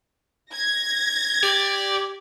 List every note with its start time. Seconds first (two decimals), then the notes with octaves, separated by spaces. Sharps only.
0.53 G#6 A#6
1.43 G4 D5